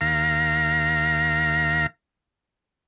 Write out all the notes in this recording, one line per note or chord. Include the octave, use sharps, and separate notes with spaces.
D#2 F5 A#5